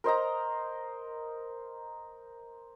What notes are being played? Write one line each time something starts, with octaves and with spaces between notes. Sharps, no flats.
A#4 C5 D#5 A#5